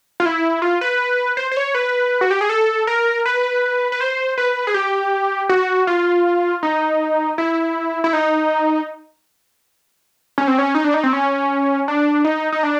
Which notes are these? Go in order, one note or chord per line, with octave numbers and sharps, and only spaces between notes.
F4
E4
F4
B4
C5
C5
C#5
B4
F#4
G4
G#4
A4
A#4
B4
B4
C5
B4
G#4
G4
F#4
F4
D#4
E4
E4
D#4
C#4
C4
C#4
D#4
D4
D#4
C4
C#4
D4
D#4
D#4
D4